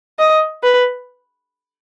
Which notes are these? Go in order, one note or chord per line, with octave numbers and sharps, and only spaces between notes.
D#5
B4